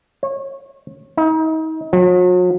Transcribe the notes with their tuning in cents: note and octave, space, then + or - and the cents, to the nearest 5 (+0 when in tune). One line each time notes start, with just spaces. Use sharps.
C#5 -25
D#4 +35
F#3 -45